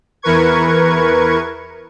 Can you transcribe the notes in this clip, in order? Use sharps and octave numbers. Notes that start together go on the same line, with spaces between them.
E2 E3 A#4 B4 C#6 G#6